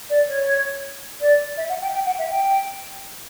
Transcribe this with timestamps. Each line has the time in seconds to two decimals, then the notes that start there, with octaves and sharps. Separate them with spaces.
0.09 D5
0.28 C#5
1.21 D5
1.57 E5
1.69 F#5
1.81 G5
1.94 G5
2.06 F#5
2.18 E5
2.30 G5